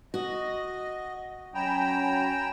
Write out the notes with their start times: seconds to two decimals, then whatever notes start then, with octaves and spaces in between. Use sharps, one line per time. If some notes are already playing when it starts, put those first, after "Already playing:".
0.14 F#4 D#5
1.55 F#3 C#4 G5 G#5 A#5 B5 E7